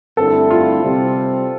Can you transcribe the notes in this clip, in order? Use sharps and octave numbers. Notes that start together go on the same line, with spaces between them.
G2 D3 A3 C4 E4 A4
F4
C3 G3 C4